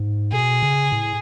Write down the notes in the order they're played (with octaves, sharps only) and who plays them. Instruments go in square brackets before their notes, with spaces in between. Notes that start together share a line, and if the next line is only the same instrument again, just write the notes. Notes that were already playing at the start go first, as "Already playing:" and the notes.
Already playing: [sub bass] G#2
[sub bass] B2 [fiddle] G#4
[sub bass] C#3
A2